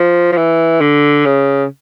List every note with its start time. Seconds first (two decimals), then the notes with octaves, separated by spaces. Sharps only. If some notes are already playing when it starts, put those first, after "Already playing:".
Already playing: F3
0.32 F3
0.37 E3
0.81 D3
1.26 C#3